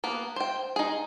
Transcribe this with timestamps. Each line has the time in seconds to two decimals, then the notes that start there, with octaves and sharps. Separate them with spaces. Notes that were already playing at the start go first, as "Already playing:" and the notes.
0.04 A#3 B3
0.36 C5 G5
0.76 D#4 G#4